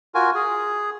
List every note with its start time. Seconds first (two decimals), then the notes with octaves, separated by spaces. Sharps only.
0.15 F4 F#4 A#4 G#5
0.35 G#4